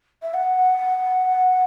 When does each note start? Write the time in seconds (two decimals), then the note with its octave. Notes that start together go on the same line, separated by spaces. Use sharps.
0.22 E5
0.34 F#5